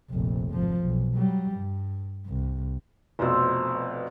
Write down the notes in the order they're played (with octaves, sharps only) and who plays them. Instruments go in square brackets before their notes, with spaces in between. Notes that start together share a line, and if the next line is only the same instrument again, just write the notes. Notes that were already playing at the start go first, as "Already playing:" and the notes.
[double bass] F1 A#1
G#1 F3
B1
F#3 G3
G2
C2
[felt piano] F1 F2 B2 [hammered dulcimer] C5 E5